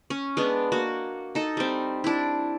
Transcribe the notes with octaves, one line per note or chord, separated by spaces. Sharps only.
C#4
G#3 B3 D4
A#3 F#4
D#4 A4
G3 C4
D4 E4